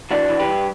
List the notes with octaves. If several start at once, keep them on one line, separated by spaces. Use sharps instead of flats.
E3 D4 F#4
E3
G4 B4
G2